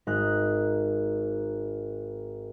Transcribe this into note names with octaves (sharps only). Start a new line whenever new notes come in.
G#1 D#4 F#6